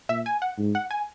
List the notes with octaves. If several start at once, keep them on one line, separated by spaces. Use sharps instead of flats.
A#2 E5
G#5
F#5
G#2
F#5
G#5